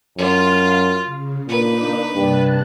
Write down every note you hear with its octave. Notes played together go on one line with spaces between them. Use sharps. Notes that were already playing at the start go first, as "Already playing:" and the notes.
F#2 F4 F5
C#3
A#2 A#3 D4 D#4 B4
G2 C3 A5 F#6